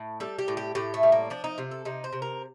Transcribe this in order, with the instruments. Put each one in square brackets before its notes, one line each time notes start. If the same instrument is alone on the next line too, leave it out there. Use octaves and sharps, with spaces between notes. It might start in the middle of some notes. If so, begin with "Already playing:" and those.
Already playing: [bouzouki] A2
G3 A4
G4
A2
G4
A2 G4
A3
G3
A#3
F3 D4
D#4
C3 F4
A4
C3 D#4
C5
C3
A#4